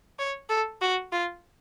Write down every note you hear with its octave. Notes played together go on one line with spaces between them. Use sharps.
C#5
A4
F#4
F4